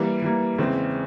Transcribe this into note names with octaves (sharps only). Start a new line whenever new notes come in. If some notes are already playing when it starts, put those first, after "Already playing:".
Already playing: E3 G3 A#3
E3 G3 A#3
E2 C#3 E3 G#3 C4